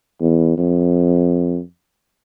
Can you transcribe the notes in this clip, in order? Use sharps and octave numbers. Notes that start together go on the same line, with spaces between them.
E2
F2